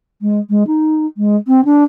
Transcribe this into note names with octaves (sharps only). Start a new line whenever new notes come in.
G#3
G#3
D#4
G#3
C4
D4